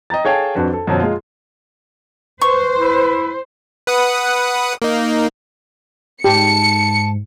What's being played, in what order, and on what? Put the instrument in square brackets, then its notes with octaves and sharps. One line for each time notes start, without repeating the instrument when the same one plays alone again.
[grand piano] D#5 G5 A#5 A6
G#4 A4 C#5 F5 G5 A5
F2 D4 F#4 B4
A4
F#2 B2 F3 F#3
G#3 F4
[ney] B4 [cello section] C5 [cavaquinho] C#6
[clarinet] E4
[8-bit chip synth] B4 F#5 D#6
A#3 D#4
[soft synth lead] G#2 [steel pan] G4 [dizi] A5 [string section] C#7